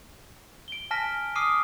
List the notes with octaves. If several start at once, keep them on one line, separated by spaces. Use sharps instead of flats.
D7 G7
G#5 A5 F6 A#6 B6 D7
D6 D#6 F6 C7 D7 D#7